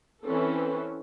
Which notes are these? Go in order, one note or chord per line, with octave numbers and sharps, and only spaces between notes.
E3 C4 C#4 A4